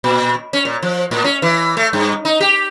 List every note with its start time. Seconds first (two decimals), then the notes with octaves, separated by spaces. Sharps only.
0.04 A#2
0.53 C#4
0.65 A#2
0.83 F3
1.11 A2
1.24 C#4
1.42 E3
1.77 A3
1.93 G2
2.25 D#4
2.40 G4